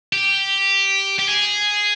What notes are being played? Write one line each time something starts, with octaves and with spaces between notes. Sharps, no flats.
G4
G4
G#4